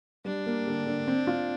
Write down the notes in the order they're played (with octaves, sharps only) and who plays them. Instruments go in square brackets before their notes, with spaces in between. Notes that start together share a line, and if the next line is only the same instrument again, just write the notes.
[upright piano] G3 [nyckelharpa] D4
[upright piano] A#3
D3
D3
C4
F4